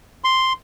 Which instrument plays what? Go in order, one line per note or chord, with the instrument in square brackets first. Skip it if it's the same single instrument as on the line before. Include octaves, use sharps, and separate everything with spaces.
[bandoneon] C6